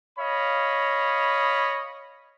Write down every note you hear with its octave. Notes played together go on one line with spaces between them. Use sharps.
C#5 D#5 F5 B5